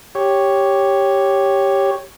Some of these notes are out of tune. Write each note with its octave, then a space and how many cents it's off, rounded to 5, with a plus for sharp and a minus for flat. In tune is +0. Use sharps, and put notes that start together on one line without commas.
G4 +0 C#5 +0